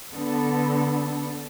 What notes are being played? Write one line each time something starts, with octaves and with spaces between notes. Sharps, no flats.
D3 B3 A4